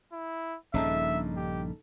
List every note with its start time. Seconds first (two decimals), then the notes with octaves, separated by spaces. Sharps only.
0.13 E4
0.74 A#1 G2 A#2 C#3 D#4 A4 E5
1.37 G4